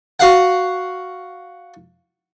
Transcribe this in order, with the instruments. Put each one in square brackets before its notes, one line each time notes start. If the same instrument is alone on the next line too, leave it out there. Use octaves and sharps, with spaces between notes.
[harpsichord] F#4 F5 F#5